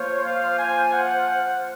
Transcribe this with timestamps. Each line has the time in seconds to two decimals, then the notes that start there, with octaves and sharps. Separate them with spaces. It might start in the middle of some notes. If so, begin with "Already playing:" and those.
Already playing: F3 A#3 F4 C5 C#5
0.25 F5
0.59 G#5
0.93 F#5